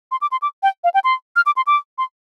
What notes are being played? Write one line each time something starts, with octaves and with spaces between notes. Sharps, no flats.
C6
D6
C6
D6
G5
F5
G5
C6
F6
D6
C6
D6
C6